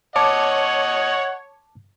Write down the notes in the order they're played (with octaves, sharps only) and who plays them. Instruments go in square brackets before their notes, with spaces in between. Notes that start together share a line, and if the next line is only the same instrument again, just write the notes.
[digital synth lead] C#5 [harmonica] D#5 F#5 [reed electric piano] A5 D6